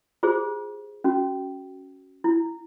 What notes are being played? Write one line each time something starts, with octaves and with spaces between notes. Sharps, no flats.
F4 G4 G#4 C5
C#4 F#4
E4